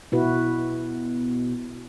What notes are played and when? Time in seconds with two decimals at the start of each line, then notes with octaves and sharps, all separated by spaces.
0.12 B2 E4 F#4 B4